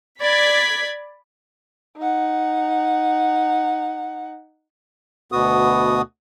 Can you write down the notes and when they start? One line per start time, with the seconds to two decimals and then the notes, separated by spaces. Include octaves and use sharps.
0.21 D5 B5 G#6 B6
1.97 D#4 F#5
5.32 D2 B2 B3 F#4 D#6